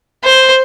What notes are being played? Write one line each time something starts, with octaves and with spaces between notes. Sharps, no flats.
C5